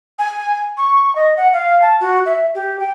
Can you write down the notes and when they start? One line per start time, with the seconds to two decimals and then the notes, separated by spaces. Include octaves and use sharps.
0.19 G#5
0.77 C#6
1.15 D#5
1.37 F#5
1.53 F5
1.82 A5
2.00 F#4
2.25 E5
2.54 G4
2.79 G5